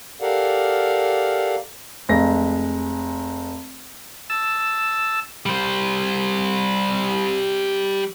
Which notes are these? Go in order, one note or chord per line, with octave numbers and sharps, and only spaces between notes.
G4 A4 A#4 D5 F5 F#5
F1 G#3 A#6
A5 E6
G3 C5